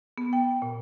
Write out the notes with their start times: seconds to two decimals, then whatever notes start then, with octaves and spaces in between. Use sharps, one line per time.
0.18 B3
0.33 G5
0.62 A#2